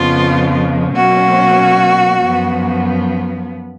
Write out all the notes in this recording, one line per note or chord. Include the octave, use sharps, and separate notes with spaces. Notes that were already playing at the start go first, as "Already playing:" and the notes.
Already playing: F2 C#3 F3 B3 F4
B2 F#3 A#3 C#4 F#4
F#2 F3 B3